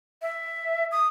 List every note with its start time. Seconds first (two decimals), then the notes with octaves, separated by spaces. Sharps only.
0.22 E5
0.92 D#6